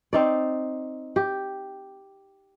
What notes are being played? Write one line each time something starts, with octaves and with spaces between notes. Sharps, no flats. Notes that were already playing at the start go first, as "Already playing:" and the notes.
C4 D#4 D5
G4